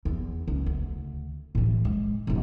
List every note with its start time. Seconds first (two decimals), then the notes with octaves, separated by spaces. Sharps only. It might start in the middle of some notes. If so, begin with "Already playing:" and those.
0.05 E2
0.48 C#2
0.66 D2
1.55 A2 E3
1.85 G#3
2.27 D#1 G#1